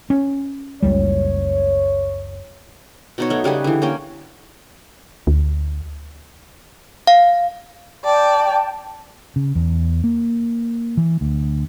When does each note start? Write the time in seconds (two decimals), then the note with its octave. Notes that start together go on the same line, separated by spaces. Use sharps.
0.10 C#4
0.82 F#1 C#2 G3 C#5
3.18 B2 D#4 C#5
3.30 F#3 A3
3.44 C#3 G3 G#4 B4
3.64 D3 E3
3.82 A#3 C#4 G5
5.27 D2
7.07 F5
8.05 D5 G5 A5
9.36 C#3
9.55 E2
10.04 A#3
10.97 E3
11.21 D2